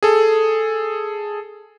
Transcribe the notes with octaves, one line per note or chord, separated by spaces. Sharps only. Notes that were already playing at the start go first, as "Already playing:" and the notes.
G#4 A4